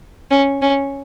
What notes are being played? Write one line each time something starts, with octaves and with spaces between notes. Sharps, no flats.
C#4
C#4